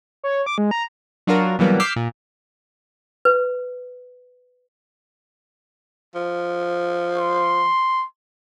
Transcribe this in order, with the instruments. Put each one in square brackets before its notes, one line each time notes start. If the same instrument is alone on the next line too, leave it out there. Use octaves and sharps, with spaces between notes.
[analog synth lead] C#5
D6
G#3
A#5
[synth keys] F#3 D4 F4 F#4 A#4
B2 E3 F#3 G3 A#3 B3
D6 E6 F6 G6 B6 C7
A#2
[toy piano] B4
[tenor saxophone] F3
[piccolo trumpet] C6